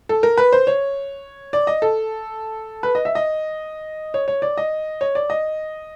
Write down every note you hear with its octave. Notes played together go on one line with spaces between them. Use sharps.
A4
A#4
B4
C5
C#5
D5
D#5
A4
B4
D#5
E5
D#5
C#5
C#5
D5
D#5
C#5
D5
D#5